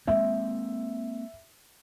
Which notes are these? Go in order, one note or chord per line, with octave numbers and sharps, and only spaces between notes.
G#3 A#3 C4 E5